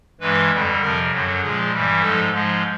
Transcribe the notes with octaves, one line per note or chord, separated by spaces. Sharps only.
G2 E3 G#3 B4
F2 D3 G3
F2 C3 F3 A#4
F#2 D3 F#3
A#2 F3 G#3 G#4
G2 E3 G3
G#2 F3 G#3 A4
G#2 F3 G#3